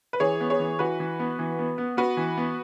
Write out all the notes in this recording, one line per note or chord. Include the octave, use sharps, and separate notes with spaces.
B4
E3 G#4 C#5
B3
G#4 C#5
E3
E3 F#4 B4
E3
B3
E3
B3
B3
B3 F#4 B4
E3
B3